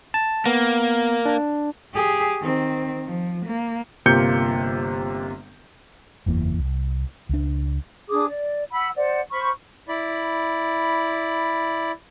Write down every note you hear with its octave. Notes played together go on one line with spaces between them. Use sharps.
A5
A#3 B3
D4
G4 G#4
D#3 C4
F3
A#3
G1 C3 A#3 F4 G6 C#7
F#1 E2 E3 A#3
C2
C#2 D4
D4 G#4 D6 D#6
D5
F#5 B5 E6
C5 D5 F#5
C5 B5 C#6 F6
E4 D5 B5